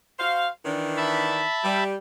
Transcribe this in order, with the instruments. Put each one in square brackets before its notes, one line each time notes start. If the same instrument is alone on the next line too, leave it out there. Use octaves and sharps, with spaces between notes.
[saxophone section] F#4 C5 F5
D#3 E3 D4
[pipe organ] E5 A5 B5
[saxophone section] G3